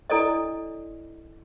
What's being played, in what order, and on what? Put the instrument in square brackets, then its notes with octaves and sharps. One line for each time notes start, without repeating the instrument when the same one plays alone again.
[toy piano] D4 E4 A4 D5 D#5